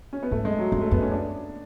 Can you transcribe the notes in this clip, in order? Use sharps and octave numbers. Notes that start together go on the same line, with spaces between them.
C#4
B3
G#2 A3
G#3
F#3
F2 G#3
A3
F#2 B3
C#4
D4